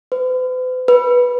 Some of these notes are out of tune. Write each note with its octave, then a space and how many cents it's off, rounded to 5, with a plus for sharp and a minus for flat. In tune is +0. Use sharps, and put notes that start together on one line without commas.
B4 +45
B4 -10